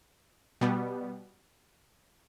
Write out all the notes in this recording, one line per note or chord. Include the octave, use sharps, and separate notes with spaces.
B2 G3 B3